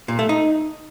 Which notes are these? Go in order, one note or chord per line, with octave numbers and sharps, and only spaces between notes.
A#2
A3
D#4